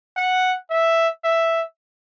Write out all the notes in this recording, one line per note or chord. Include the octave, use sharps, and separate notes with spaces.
F#5
E5
E5